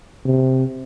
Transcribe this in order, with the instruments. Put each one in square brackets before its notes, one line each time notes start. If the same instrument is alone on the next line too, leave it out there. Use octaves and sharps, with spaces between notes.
[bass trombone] C3